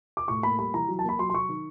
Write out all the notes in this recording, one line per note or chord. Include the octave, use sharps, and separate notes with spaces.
D6
A2 C#6
A#3 B5
G3 B5
E3 A#5
F#3
A5
A#3 B5
F#3 C6
C6
F#3 C#6
D#3